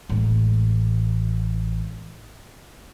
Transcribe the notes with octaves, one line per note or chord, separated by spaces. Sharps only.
A1 G#3